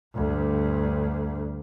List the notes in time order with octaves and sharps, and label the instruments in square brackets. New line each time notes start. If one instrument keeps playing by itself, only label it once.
[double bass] D2 G2